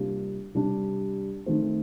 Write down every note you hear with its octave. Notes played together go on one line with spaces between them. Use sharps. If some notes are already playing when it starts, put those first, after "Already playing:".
Already playing: C3 G3 A#3 D4 F4
C3 G3 D4
D#3 A3 C4